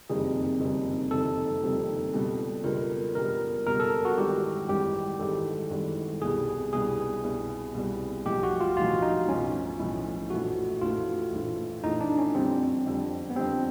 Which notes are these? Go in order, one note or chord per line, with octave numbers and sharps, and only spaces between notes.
F#1 F2 C3 D#3 G3 G#4
F#1 F2 C3 D#3 G3
F#1 F2 C3 D#3 G3 A4
F#1 F2 C3 D#3 G3
C#2 B2 G3
C#2 B2 G3 A#4
C#2 B2 G3 A#4
C#2 B2 G3 A#4
A4
F#4
G#1 G#2 E3 G3 G4
G#1 G#2 E3 G3 G4
G#1 G#2 E3 G3 A4
G#1 G#2 E3 G3
C2 B2 G3 G#4
C2 B2 G3 G#4
C2 B2 G3
C2 B2 G3
B1 A2 F3 G4
F#4
F4
B1 A2 F3 F4
D#4
B1 A2 F3 C#4
B1 A2 F3 E4
A#1 A2 E3 A3 F#4
A#1 A2 E3 A3 F4
A#1 A2 E3 A3
A#1 A2 E3 A3 D#4
D4
C#4
F2 D3 G3 C4
F2 D3 G3
B3
F2 D3 G3 C4